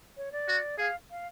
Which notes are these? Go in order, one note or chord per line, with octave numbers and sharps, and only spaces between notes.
C#5
D5
F#4
G#4 F5
F5